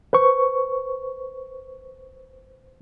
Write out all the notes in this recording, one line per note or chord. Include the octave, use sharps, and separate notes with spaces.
B4 C5 C#6